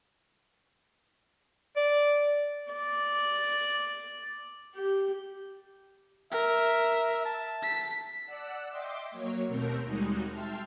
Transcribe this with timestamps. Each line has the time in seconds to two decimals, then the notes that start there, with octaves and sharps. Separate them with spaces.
1.77 D5
2.72 D5
4.76 G4
6.32 A#4 E5
7.25 A5
7.63 B6
8.26 D5 F#5 E6
8.70 D#5 E5 G5 C6 D6
9.10 F#3 A#3 C#5
9.47 D#2 B2 A3 C4 A#4 G6
9.84 D#2 G3 G#3 D#4 F#4
10.29 E5 G5 A5 C6 F6